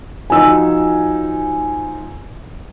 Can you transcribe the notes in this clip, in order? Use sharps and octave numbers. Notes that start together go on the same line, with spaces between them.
F3 D#4 F#4 G#5 E6